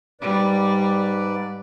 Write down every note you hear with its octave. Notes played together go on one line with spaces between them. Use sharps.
G#2 G3 B4 D5